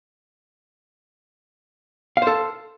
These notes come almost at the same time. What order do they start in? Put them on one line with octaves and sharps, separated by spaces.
F5 C5 A4